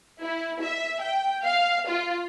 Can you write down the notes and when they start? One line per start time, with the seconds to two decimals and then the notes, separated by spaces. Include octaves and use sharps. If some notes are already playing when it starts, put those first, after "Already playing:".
0.20 E4
0.61 E5
1.00 G5
1.45 F5
1.88 F4